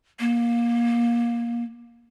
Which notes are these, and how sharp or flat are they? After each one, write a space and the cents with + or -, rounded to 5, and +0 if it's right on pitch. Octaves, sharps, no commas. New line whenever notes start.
A#3 +20